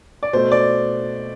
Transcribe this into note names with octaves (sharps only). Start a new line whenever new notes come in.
D5
B2 A3 C5
D5